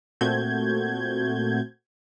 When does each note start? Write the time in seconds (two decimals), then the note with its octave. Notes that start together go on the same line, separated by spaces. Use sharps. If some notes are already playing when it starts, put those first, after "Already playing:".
0.21 A#2 A3 C4 F#4 G6 G#6